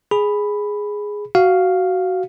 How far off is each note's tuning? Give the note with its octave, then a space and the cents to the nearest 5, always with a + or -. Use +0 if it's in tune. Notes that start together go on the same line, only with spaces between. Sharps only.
G#4 +0 B5 +0
F#4 +15 F5 +0